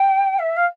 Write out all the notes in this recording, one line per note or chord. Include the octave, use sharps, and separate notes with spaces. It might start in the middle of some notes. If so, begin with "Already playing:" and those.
Already playing: G5
E5
F5